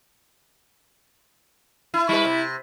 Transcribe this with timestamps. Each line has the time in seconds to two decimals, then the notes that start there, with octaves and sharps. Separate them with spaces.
1.94 E4
2.09 G3 E4 B4
2.25 C3